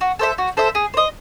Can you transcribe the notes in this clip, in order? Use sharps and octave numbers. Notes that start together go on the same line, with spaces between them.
F#4
A4 C5 E5
F#4
A4 C5 E5
G#4
C5 D#5